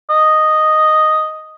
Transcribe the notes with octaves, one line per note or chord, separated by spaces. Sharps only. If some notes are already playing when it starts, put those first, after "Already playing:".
D#5